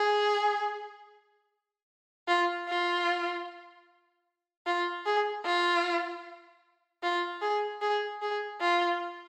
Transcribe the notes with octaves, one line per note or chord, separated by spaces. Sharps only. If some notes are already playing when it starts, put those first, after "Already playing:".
Already playing: G#4
F4
F4
F4
G#4
F4
F4
G#4
G#4
G#4
F4